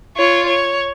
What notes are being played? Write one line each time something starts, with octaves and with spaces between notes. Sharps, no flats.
F4 C#5
C#5